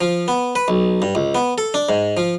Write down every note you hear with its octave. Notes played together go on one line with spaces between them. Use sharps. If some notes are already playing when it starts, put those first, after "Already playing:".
F3
B3
B4
B1
G2
C#2
B3
A4
D4
G#2
F3